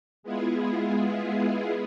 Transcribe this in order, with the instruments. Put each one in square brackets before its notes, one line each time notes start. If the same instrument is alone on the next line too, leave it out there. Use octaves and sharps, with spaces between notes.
[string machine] G#3 B3 E4 F4 G#4